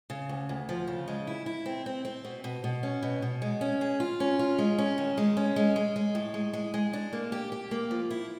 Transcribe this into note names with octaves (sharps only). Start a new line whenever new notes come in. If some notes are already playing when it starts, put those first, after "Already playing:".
C#3
D2
D2
F3
C#3
G#3
E4
E4
C4
C4
C4
B2
B2
B2
C#4
B2
B2
G#3
C#4
G#4
F4
C#4
F4
G#3
C#4
D#3
G#3
C#4
G#3
G#3
G#3
A2
G#3
G#3
G#3
D4
A#3
G4
G4
A#3
F3
E4